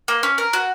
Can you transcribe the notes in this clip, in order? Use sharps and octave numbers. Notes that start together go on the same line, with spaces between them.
A#3
C#4
A#4
F#4